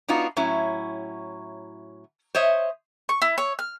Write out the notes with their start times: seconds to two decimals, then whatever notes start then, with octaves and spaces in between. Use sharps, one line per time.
0.08 B3 D4 D#4 F4 F#4
0.36 A2 F#3 C#4 E4
2.35 C5 C#5 D#5 E5
3.09 C#6
3.22 E4
3.38 C#5
3.59 F6